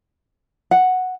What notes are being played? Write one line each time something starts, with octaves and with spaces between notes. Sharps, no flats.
F#5